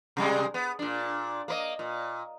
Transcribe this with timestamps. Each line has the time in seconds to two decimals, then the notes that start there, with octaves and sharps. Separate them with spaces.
0.17 C3 G3 G#3
0.54 B3
0.79 A#2 D4
1.48 A#3 B4 D#5
1.79 A#2